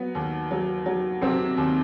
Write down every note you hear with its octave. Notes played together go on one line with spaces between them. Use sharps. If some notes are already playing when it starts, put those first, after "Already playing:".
Already playing: F#3 B3
D#2
F#3
F#3
C3 F#3 C4
D#2